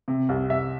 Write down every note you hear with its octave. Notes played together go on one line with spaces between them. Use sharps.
C3
C2
C2 E5